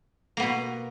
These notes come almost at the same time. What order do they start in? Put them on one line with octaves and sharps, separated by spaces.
A#3 B3 B2